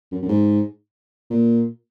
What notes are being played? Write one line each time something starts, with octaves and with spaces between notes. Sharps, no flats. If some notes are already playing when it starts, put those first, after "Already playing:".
F#2
F#2
G#2
A#2